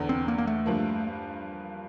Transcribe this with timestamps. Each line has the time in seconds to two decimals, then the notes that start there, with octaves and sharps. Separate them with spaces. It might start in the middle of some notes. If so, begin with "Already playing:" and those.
Already playing: F1 E2 D3
0.09 C4
0.28 A#3
0.38 A#3
0.47 A3
0.66 G2 F3 A#3